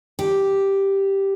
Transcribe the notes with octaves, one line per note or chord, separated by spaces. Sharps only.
G4